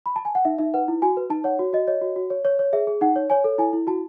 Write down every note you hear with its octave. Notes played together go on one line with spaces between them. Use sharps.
B5
A5
G#5
F#5
D#4 E5
D#4 E5
B4 F#5
E4
F#4 G#5
B4
D#4 A5
C#5 F#5
F#4
F#4 D#5
C#5 D#5
F#4
F#4
C#5
C#5
C#5
G#4 E5
G#4
D#4 F#5
C#5
C#5 G#5
A4
E4 G#5
E4
F#4 A5